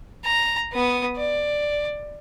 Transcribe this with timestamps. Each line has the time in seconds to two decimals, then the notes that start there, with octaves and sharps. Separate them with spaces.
0.25 A#5
0.73 B3 D#6
1.17 D5